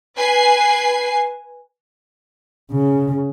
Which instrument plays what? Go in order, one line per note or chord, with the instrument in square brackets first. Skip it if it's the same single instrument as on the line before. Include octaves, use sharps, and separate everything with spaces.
[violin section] B4 G#5 C7
[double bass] C#3